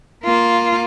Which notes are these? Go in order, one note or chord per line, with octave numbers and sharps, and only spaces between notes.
A#3 F4